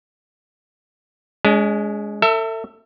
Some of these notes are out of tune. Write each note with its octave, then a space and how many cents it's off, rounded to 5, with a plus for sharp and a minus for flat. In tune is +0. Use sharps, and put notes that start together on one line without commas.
G#3 +0 C#4 +45
A4 +35 E5 +0